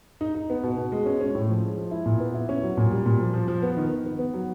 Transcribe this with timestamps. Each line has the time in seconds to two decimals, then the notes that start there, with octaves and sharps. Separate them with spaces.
0.21 D#4
0.35 D#4
0.50 B3
0.63 B2
0.78 B2
0.92 G#3
1.06 C#4
1.21 C#4
1.35 A2
1.49 F3
1.64 G#3
1.78 F3
1.91 E4
2.06 A#2
2.20 B3
2.34 E4
2.49 C#4
2.63 F#3
2.77 A#2
2.91 G3
3.06 A#2
3.20 F3
3.34 F3
3.48 F3
3.62 B3
3.77 D#3
3.91 D#3
4.05 B3
4.19 B3
4.34 F#3